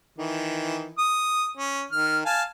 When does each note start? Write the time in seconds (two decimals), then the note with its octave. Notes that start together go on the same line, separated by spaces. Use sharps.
0.18 D#3 E3
0.98 D#6
1.57 C#4
1.92 D#3 F6
2.25 F5 G#5 A5